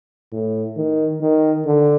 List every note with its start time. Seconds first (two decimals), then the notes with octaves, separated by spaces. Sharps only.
0.32 A2
0.77 D#3
1.21 D#3
1.66 D3